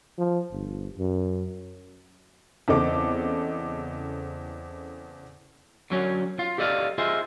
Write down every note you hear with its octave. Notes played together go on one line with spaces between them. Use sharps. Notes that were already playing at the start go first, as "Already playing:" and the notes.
F3
G1
F#2
E2 C#3 C4 A4 D#5 D6
D3 F#3 C#4
F4
G4 A4 D5 D#5 F5
F4 G#4 C5 D#5 E5